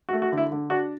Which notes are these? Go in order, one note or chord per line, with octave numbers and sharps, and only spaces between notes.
F#4
A3
F#4
D3
E4
D3
D4 F#4